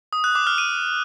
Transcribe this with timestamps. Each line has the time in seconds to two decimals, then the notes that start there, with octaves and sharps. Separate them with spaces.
0.13 D#6
0.24 F#6
0.35 D6
0.47 F6
0.58 D#7